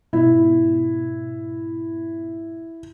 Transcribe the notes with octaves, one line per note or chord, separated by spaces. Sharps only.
G#2 B2 E4